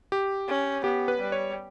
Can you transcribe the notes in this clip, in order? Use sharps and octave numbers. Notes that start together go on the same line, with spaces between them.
G4
C#4
B3 G4
B4
G3
C#5